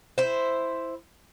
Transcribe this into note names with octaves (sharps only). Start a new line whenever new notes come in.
E4 C5